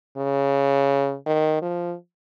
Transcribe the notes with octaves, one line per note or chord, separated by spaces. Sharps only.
C#3
D#3
F3